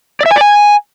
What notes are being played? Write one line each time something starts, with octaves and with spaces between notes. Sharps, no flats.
D5
E5
G#5
D5
G#5